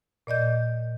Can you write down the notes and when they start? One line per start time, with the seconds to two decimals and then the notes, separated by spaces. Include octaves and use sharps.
0.27 A#2 D5 D#5 G6